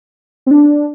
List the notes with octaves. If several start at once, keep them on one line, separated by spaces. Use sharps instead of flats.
C4
D4